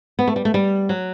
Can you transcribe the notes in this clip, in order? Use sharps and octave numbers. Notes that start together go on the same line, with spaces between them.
B3
A3
G3
A3
G3
F#3